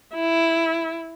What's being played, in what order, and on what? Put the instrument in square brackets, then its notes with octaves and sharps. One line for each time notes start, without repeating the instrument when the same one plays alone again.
[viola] E4